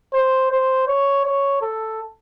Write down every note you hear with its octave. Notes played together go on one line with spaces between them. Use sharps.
C5
C5
C#5
C#5
A4